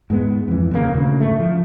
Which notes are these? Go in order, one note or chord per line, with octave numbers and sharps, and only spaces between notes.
G#2 G#3 B3
F2 E3
D#2 A#2 C#3 A#3
D2 C#3
G#2 A3
F3